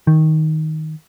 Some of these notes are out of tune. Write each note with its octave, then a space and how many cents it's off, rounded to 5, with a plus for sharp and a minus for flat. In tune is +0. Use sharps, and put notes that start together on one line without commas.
D#3 +10